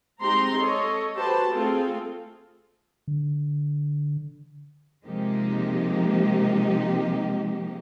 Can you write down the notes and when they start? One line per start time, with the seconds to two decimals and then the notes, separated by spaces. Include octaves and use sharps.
0.22 G#3 C4 D#4 G4 A#5 C6
0.59 A4 C#5 D#5
1.17 F#4 G4 B4 C5 A5
1.52 A3 C4 F4 G#4 A4
3.08 D3
5.06 C3 F3 G#3 A#3 D#4 G4